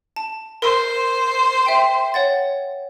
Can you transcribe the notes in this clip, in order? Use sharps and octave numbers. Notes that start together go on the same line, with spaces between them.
A5
A#4 C5
E5 G5
C#5 F#5 A6